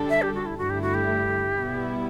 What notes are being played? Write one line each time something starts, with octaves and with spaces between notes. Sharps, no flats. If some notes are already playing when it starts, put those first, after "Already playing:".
Already playing: D3 G3 D4 A4
E5
G4
F#4
E4
G2 D3 A3 E4 F#4
G4
F#4
G4
B2 G3 B3 E4